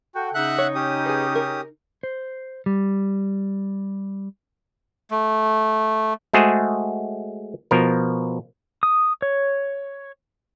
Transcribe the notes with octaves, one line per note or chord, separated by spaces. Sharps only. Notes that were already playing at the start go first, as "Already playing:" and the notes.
F#4 A4 F#5 G5
C#3 D#4 E5 F#5 F#6
C#5
C#4 G4 D#6
G#4 B4
A#4
C5
G3
A3
G#3 A3 F#4 G#4 C5
B2 F3 A#4
D#6
C#5